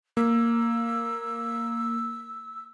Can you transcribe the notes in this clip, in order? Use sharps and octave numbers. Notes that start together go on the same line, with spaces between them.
A#3 E6